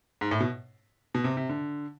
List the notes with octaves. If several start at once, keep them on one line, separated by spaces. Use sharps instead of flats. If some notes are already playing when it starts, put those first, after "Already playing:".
G#2
A2
B2
B2
C3
C3
D3